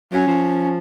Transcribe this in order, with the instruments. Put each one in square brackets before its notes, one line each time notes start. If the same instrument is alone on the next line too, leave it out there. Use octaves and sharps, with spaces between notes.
[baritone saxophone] F#3 [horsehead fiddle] C#4
[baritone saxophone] F3